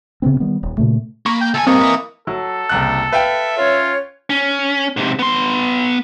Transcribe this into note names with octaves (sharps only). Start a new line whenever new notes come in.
C#3 F3 B3 C4
D#3 G3 B3
D#1
A#2 C#3 A3
A#3 B5 C#6
G5
D2 A4 G#5
G2 A#3 C4 D#5 C#6
E4 B4
F#3 A4
F#1 C2 F#6
B4 E5 F5 G5
C#4 F4 C#5
C#4
G#2 C3
B3 C6